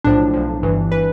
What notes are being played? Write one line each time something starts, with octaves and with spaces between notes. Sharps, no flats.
B1 A2 F3 D4
B1 A2 F3
G1 G2 E3
E3 B4